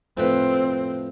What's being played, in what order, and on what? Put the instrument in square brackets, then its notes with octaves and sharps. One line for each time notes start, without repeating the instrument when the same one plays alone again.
[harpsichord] F2 A2 B4 [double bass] C4